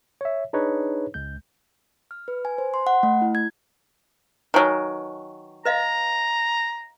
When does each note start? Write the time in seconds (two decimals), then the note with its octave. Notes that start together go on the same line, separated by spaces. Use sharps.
0.21 C#5 E5
0.53 D4 D#4 G#4 B4 C#5
1.14 C#2 G#3 G6
2.11 F6
2.28 B4
2.45 G#5
2.58 C5
2.74 C6
2.87 F#5
3.03 A3
3.22 E4
3.35 G#6
4.54 D#3 F#3 B4 G#5 A5
5.65 B4 D#5 F5 A#5